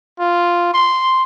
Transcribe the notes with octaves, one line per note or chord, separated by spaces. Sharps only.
F4
C6